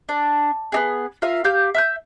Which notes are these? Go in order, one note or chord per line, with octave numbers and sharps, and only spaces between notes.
D4
B3 D#4 G#4
F4 A#4 E5 F5
G4 F5 G6
E5 F6 G6